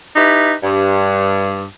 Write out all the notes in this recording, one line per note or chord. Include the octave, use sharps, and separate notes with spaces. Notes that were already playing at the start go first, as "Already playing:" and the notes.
D#4 E4 G4 B4
G2